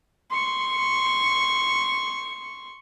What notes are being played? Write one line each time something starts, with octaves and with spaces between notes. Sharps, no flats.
C6 C#6